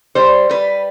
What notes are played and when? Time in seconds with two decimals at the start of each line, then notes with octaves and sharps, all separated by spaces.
0.15 G3 C5
0.49 G3 B4